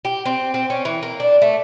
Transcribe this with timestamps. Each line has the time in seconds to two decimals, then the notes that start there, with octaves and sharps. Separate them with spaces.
0.05 G4
0.26 C4
0.54 C4
0.70 C#4
0.85 E3
1.03 A#3
1.20 D4
1.42 A3